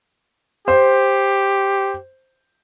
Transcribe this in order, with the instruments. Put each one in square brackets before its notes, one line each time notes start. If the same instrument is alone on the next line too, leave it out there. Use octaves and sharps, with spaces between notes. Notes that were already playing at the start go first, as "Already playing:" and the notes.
[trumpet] G4 [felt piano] C5